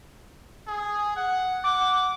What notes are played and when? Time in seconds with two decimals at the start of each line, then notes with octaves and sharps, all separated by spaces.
0.67 G#4
1.16 F#5
1.64 F#5 D6